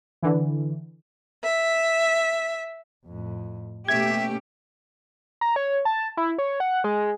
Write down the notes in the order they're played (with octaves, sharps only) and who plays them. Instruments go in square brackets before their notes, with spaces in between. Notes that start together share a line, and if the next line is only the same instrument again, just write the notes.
[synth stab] D3 E3
[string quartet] E5
[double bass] F2 A2
[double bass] B2 A#3 [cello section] A3 C#4 G4 [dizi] E5 [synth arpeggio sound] G#6
[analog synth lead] A#5
C#5
A5
E4
C#5
F#5
G#3